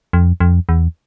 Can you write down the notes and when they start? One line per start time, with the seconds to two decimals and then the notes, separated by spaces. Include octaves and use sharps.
0.13 F2
0.40 F2
0.69 E2